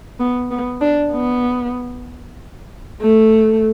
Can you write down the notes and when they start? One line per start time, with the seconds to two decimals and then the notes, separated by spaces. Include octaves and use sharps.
0.20 B3
0.51 B3
0.81 D4
1.12 B3
3.01 A3